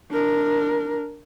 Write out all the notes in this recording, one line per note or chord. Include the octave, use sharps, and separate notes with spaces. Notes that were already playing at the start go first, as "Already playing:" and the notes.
D4 A#4